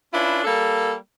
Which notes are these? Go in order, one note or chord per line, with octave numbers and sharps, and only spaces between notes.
C#4 D4 E4 F4 B4
G3 A#3 A4